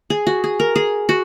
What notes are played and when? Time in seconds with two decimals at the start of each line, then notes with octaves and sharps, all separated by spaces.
0.10 G#4
0.27 F#4
0.44 G#4
0.60 A#4
0.76 G#4
1.09 F#4